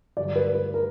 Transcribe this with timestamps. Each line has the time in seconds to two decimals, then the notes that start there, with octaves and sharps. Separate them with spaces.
0.17 G2 D3 F#3 D5
0.36 B4
0.55 B4
0.74 A#4